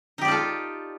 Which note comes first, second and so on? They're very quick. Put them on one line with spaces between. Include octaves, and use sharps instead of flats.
D#4 G4 D5 F4 A4